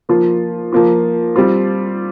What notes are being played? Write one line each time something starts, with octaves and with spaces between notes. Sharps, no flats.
F3 A#3 F4
F3 A#3 F4
G3 C4 F4